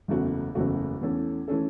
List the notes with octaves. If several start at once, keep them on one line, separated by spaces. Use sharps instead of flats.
F#1 E2 C#3 A3 F#4
F#1 E2 C#3 A3 F#4
E2 E3 A3 C#4 A4
E3 A3 C#4 A4